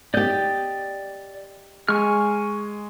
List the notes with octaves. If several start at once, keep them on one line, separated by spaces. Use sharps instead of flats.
G4 D5 D#5 G6
G#3 G#5 C#6 F6